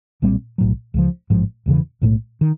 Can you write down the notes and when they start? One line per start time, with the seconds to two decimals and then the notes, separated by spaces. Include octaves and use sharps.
0.22 B1 A#2 G3 C4
0.58 B1 A2 F#3
0.94 C#2 C#3 F3
1.30 A1 G#2 F3
1.66 E1 E2 C#3 E3
2.02 B1 A2 F3 A3
2.41 D#3